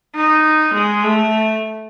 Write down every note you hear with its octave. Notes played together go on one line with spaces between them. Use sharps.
D#4
G#3
A3